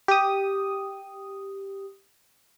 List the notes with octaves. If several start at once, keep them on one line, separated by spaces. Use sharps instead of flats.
G4 D#6